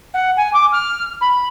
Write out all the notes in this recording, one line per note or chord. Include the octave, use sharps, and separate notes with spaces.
F#5
G#5
D6
F6
B5